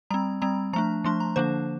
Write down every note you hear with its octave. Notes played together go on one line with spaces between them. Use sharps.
G3 C4 A#5
G3 C4 A#5
F3 A3 D4 A#5
F3 A3 D4 C6
A#5
D3 F3 A#3 D4 C5